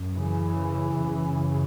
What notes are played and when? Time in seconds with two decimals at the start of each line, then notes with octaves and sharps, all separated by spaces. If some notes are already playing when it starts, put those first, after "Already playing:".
Already playing: F#2
0.14 C#3 E3
0.97 F#2 C#3